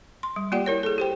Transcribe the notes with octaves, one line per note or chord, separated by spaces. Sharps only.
C6
G3
A#3 F4 G4 D5 F#5 G5
E4 A#4 C#5
G#4 A4
G4 C5 G5